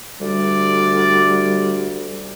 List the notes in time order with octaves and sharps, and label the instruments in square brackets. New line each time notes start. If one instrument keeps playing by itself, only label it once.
[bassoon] D2 [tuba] G3 [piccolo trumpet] D5